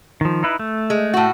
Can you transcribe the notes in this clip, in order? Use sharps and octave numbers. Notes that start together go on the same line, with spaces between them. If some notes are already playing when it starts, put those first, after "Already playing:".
D#3 F3
D#4 E4 B4
A3
G#3
A2 F#4